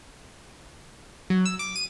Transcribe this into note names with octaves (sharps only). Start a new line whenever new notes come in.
F#3
E6
D6
D#7